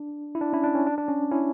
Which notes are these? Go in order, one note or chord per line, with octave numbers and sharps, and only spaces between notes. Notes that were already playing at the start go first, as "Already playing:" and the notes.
Already playing: D4
E4
D4
C#4 E4
D4
C#4
D4
D4
C#4
C#4 E4